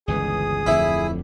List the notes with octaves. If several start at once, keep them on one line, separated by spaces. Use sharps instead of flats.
G1 C#2 E3 G#4 D#6
D1 F2 D3 E4